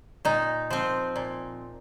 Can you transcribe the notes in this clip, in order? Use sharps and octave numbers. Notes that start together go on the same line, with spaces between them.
A#2 D#4
F3 C4
A#2